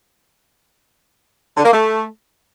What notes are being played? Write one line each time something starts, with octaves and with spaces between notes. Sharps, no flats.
D3
A#3
A3